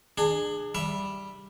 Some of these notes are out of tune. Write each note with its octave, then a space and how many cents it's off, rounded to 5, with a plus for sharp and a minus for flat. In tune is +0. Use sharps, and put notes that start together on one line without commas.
D4 +30 G#4 +0
G3 +0 E5 +0